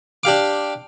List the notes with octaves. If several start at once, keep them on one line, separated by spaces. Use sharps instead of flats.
D4 G4 F5 D6